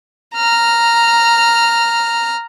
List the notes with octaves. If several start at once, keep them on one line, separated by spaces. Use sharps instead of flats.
A#5 F6